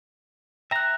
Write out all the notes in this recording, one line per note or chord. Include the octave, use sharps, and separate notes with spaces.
E5 G5 A#5 F#6